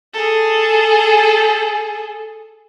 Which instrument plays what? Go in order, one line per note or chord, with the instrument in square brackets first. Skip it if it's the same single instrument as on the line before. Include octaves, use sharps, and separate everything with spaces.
[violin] G#4 A4